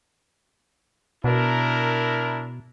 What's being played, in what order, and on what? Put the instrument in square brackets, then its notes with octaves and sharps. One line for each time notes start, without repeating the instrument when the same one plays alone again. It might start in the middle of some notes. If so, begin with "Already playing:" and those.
[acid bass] B2 [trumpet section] D4 E4 A#4